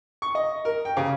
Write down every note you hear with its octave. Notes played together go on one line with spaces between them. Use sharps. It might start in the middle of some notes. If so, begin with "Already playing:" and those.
C#6
D#5
A#4
G5
C#3